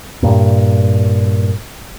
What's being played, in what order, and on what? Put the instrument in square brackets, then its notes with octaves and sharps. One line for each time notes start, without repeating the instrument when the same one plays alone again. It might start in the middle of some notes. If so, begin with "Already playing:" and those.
[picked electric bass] G2 A#2